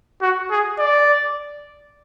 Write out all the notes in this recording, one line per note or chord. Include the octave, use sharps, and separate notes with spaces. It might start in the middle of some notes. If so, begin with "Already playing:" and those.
F#4
G#4
D5